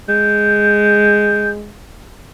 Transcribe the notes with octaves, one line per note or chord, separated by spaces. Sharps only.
G#3 G6